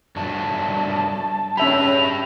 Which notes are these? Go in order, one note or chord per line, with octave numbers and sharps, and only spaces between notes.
G2 F#3 A3 A5
C#4 G4 B4 E5 B5 F7